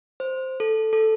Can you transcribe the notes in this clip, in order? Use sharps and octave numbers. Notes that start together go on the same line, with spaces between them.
C5
A4
A4